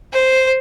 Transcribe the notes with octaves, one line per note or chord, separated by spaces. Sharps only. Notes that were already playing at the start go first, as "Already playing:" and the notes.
C5